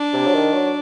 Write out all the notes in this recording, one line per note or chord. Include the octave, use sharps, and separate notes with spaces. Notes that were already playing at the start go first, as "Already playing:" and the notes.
Already playing: D4
C3
F#3
D#3
F#3